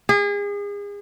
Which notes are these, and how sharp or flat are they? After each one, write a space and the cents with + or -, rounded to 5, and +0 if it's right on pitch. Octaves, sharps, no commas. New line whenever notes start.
G#4 -35